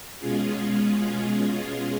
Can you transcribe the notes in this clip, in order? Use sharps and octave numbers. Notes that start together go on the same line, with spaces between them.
B2 G#3 C#4 F4 G#4